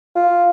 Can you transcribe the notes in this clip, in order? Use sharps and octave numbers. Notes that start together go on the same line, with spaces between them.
F4